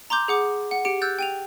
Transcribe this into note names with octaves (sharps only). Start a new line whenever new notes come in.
A#5 C6 D6 G6
G#4 F#5 D6
F#5
G4 C#7 D7
E6 F#6 G6 A6
G5 D#7 F7